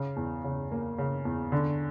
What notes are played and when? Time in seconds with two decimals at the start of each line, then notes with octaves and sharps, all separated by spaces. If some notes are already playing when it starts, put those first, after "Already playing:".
Already playing: C#3
0.16 E2
0.44 C#3
0.72 A#3
0.98 C#3
1.25 E2
1.52 D3